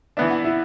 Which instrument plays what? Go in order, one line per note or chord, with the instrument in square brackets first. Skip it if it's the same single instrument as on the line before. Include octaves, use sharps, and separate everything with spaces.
[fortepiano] E3 B3 D4 [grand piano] E5
[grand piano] F#5
E4 E5